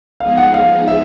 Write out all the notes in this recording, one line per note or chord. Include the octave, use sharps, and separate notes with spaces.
F3 G#3 B3 D#4 G#4 F5
F#5
F5
E5